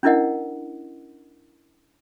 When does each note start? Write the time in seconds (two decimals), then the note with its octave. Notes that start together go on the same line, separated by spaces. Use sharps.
0.03 C#4 D4 E4 A#4 D#5 F#5